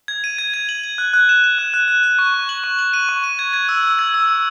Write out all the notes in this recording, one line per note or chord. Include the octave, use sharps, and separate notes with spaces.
G#6
D#7
G#6
G#6
F#7
F#7
F#6
F#6
E7
E7
F#6
F#6
F#6
F#6
C#6
C#6
F#7
C#6
F#7
D#7
C#6
D#7
G#6
G#6
E6
E6
G#6
E6
E6